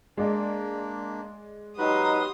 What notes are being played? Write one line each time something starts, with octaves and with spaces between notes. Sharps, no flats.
G#3 A#3 D4 D5
F#3 D#4 F#4 G4 B4 C6 D#6